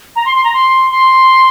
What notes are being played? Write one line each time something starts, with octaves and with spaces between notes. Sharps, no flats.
A#5
C6
C6
A#5
C6
C6